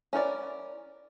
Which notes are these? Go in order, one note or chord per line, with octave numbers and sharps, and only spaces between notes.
C#4 E4 A#4 C#5 D5